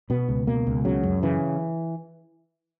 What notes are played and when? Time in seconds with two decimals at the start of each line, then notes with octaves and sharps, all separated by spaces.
0.10 B2 B3
0.29 C#2
0.47 B2 A#3
0.67 C#2
0.85 C#3 F#3
1.03 F#2
1.22 C#3 E3